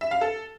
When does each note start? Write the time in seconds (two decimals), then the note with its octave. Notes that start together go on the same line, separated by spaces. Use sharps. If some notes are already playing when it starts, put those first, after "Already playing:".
0.01 E5
0.11 F5
0.21 A4